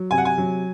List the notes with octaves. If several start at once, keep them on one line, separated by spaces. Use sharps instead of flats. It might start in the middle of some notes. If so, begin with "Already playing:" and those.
Already playing: F#3
C3 G#5
F#5
G#5
F#3